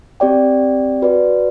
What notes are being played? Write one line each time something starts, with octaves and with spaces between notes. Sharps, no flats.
C4 G4 D5 G5
F#4 B4 D5